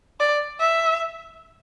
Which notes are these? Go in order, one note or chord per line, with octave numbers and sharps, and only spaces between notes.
D5
E5